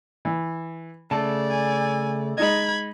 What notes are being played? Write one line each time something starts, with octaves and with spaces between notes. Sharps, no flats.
E3
C#3 A3 D5 A5
G#5
G#3 D#4 D#5 B5 G#6